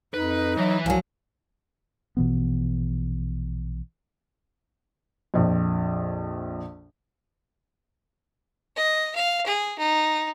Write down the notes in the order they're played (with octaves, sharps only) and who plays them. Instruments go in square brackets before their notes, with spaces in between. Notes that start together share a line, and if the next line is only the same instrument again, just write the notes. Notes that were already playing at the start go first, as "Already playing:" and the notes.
[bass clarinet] F2 [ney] D#4 [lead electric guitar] B4
[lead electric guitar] E3 E5 [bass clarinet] F#3
[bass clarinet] C2 [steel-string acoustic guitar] F3 F#3 [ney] G#5
[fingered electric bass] A#1 B2 E3 B3
[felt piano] A#1 F2
[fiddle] D#5
F5
G#4
D#4